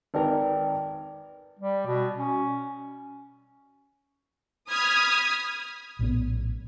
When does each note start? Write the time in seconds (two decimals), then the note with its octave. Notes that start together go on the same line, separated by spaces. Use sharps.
0.14 G#1 A#4 B4 D5 G5
1.59 G3
1.86 B2
2.18 C#4
4.71 B5 D#6 F6 G#6 B6
5.99 A#1 A2 B3